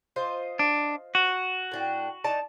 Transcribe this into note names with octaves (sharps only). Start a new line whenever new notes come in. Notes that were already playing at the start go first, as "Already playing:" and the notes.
F4 C5 D#5
D4
F#4
A2 D4 G5
D#4 D5 A5